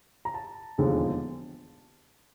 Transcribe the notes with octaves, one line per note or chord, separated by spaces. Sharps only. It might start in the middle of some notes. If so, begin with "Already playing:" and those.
A#5
A5
E1 D#2 D3 F3 G#3